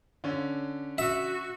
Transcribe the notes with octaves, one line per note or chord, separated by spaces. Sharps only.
D3 C#4
F#4 E5